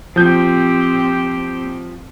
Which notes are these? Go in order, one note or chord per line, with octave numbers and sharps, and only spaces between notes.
F3 C4 G4 G6